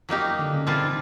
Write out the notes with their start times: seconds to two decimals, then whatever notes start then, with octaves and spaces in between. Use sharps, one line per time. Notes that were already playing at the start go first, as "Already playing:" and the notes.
0.09 F3 F#3 A#3 D#4 G4
0.39 D3
0.53 C#3
0.67 A#2 E3 G3 C4 F4 A4
0.82 D#3